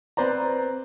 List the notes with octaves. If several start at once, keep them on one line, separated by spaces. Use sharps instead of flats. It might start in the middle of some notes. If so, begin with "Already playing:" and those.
C4 B4 C5 D5 A#5